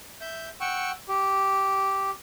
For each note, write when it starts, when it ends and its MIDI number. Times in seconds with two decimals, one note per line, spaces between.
0.21 0.49 76
0.21 0.49 91
0.61 0.91 78
0.61 0.91 79
0.61 0.91 85
0.61 0.91 88
1.09 2.11 67